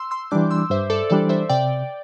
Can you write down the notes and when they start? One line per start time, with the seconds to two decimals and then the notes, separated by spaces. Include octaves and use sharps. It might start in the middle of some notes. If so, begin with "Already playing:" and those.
Already playing: C6 E6
0.11 C6 E6
0.31 E3 G3 D4 D6 G6
0.51 C6 E6
0.70 G2 C5 E5
0.90 A4 D5
1.10 E3 G3 D4 A4 D5
1.29 C5 E5
1.49 C3 D5 G5